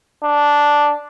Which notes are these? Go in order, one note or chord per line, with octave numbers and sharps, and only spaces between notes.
D4